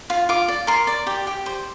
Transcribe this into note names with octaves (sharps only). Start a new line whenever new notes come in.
F4
F4 D6
D5
A#4 C6
D5
G4
G4
C5